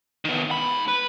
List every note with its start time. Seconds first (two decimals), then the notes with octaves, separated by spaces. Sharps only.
0.25 D#3 B3
0.51 G#2 B5
0.88 B4